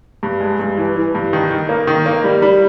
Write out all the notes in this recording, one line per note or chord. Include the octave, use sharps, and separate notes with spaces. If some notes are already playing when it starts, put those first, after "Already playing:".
G2
G#3
G2
E3
E3
G2
D#3
D#3
A#3
D#3
A#3
G3
G3